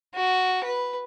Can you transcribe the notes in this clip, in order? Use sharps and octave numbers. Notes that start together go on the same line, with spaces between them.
F#4
B4